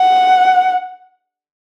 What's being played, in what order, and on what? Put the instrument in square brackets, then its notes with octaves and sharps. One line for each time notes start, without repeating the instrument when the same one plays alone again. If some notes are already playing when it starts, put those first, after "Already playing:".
Already playing: [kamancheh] F#5